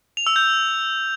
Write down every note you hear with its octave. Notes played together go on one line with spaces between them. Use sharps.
F7
E6
G6